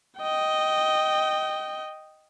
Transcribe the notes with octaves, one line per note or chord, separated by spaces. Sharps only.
D#5 G5